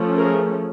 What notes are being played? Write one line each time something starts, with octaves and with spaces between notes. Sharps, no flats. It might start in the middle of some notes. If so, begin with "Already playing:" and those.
Already playing: F3 A3 C#4
G#4 A#4